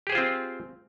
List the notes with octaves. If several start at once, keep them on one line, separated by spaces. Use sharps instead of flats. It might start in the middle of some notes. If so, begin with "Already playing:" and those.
C4 F4 G4 G#4 C5